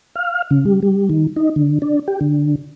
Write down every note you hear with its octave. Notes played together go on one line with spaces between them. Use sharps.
F5
C#3
G3
G3
D#3
D#4
D3
D4
G4
D3